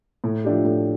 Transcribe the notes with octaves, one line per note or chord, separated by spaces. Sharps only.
A2
F3 A3 D4 G4
A2